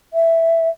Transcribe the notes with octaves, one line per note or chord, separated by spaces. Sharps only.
E5